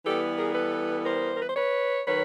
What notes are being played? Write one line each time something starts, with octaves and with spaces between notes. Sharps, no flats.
E3 G3 B3 G4 A4
G#4 A#4
A4 B4
A#4 C5
A#4
B4
C5
B4 C#5
D#3 F#3 B4 C#5